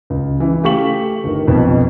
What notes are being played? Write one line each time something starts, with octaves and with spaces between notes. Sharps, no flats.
C#2
C#3 E3
A3 G4 F5 C#6 B6 F#7
G1 D#3
B1 F2 B2